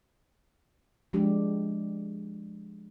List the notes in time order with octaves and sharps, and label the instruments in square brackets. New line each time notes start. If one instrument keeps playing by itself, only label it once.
[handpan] F3 G#3 D4 G4